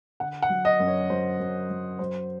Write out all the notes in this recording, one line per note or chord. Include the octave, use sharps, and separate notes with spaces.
D3 F#5
F#5
F#3
D#5
F#2
C#5
F#3 C5
F#2
F#3
F#3 C5